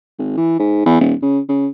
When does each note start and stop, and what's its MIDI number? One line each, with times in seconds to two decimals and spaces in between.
0.19 0.34 32
0.37 0.57 52
0.59 0.82 44
0.86 0.99 40
1.00 1.14 27
1.22 1.39 49
1.49 1.67 49